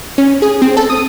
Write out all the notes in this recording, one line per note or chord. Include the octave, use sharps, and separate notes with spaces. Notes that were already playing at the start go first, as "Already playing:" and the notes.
C#4
G#4
C4
A4
D#6